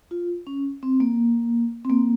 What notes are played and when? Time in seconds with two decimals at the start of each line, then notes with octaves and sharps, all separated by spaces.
0.11 F4
0.47 C#4
0.83 C4
1.00 A#3
1.85 C4
1.90 A#3